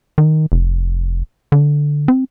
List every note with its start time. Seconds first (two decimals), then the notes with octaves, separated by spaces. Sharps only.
0.18 D#3
0.52 F1
1.52 D3
2.08 C4